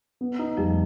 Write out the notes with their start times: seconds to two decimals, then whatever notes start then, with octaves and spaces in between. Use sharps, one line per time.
0.21 B3
0.39 D#4
0.57 F2 F3 G3